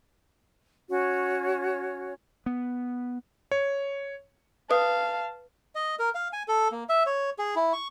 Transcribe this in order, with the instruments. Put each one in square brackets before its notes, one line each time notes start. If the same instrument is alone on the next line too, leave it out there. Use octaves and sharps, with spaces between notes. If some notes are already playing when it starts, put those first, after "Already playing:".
[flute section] C#4 F#4 C#5
[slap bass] B3
[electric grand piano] C#5
[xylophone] B4 D#6 [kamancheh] F5 A5
[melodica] D#5
A#4
F5
G#5
A4
A#3
E5
C#5
G#4
E4
C#6